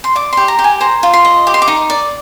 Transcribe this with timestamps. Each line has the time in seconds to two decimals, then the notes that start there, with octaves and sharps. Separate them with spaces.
0.04 C6
0.15 D5 D6
0.33 G4 C6
0.48 A#5
0.59 G4
0.64 G#5
0.81 C5 A#5
1.03 F4
1.13 C6
1.25 D#5
1.47 G4 D6
1.54 C6
1.62 D6
1.68 D#4
1.90 D5